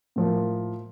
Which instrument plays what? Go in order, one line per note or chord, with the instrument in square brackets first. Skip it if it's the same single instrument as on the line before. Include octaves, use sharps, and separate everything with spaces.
[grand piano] A2 F3 A#3